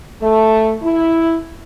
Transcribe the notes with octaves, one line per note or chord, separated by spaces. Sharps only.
A3
E4